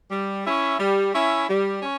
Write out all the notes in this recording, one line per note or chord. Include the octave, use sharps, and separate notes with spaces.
G3
C#4 E4
G3
C#4 E4
G3
C#4